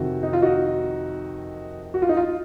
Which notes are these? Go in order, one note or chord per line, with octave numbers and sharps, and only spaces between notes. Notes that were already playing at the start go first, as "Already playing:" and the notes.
Already playing: F2 C3 D#3 F#4
D#4
F4
D#4 F#4
F#4
F4
D#4
F4